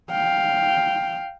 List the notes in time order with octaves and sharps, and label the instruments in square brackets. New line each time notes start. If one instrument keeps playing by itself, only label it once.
[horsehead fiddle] F5 G5